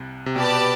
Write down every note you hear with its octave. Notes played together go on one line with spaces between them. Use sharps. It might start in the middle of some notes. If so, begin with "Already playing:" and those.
Already playing: C2 C3
C3
B2 G4 B4 D5 A5